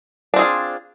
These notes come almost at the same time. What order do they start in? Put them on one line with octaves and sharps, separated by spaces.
D4 C4 G#4 F4